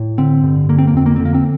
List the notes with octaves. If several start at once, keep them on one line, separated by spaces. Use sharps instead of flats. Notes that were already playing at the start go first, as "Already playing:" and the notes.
Already playing: A2
D3 C4
G2
D3 A#3
C4
A#3
F2 C4
A#3
D3 C4
A#3
C4